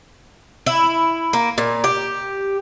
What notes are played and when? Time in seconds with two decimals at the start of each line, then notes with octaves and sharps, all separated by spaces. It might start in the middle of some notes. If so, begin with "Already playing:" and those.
0.66 E4
1.33 A#3
1.58 A#2
1.84 G4